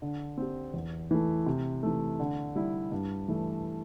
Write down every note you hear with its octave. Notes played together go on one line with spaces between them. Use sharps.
D3
C4 G4
E2
E3 A3
C3
E3 A3
D3
G3 E4
G2
E3 A3